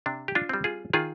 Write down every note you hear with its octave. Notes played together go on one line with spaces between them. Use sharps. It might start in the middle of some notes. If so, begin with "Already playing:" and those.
C3 D4
G4
D4 F4
G3 C4
F4 G#4
D#3 F4 G#4